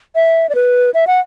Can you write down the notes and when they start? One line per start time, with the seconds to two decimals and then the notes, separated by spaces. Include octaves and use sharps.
0.15 E5
0.49 D5
0.55 B4
0.94 E5
1.07 F#5